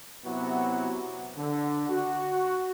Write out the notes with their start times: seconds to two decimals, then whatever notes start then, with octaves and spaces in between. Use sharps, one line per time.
0.24 C3 F#3 B3 E4 F#4
1.37 D3
1.89 F#4